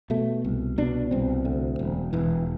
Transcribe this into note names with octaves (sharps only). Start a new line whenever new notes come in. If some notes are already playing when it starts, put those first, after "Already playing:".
B2 A3
C2
B2 D4
C2 C4
D2
E1
E1 E3